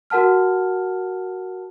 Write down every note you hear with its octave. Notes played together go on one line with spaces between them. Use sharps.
F#4 A#4 F#5 A5 F6